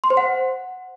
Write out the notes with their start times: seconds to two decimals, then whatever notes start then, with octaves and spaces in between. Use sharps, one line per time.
0.04 C6
0.10 C5
0.17 F#5